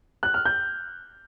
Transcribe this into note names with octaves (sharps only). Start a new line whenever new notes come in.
F#6
F6
G6